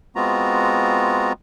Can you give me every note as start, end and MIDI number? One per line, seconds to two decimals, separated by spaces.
0.16 1.33 56
0.16 1.33 59
0.16 1.33 60
0.16 1.33 65
0.16 1.33 66
0.16 1.33 82